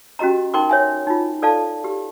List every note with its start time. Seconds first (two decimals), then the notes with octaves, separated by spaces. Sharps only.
0.19 C#4 F#4 G4 D#5 A#5
0.54 D#4 A#4 G5 C6 D6
0.69 C#5 E5 G#5
1.07 D#4 F4
1.42 A4 D5 F5 A5
1.84 G4